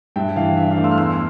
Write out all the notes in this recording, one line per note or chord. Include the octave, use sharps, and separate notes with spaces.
G2 E5 G5
E3 F5
D4 E5
F5
A3
C6 E6
F6
E2 C6 E6